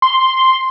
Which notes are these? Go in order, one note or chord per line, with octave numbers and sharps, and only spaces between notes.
C6